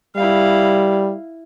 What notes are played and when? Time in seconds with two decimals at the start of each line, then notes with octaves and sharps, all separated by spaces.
0.16 G3 E4 F5